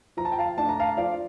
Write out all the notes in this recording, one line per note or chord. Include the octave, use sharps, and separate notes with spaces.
F3 A#5
A5
G5
F5 A5
A3 D4 A5
A#5
F5 A5
F3 D5 F5